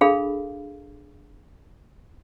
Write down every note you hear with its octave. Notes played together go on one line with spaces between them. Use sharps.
D4 G#4 A4 F5 B5